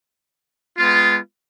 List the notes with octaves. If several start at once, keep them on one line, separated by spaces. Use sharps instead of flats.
G#3 B3 F4